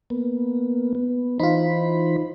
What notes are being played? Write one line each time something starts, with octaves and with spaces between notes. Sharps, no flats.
A#3 B3
B3
E3 D#4 F4 C5 B5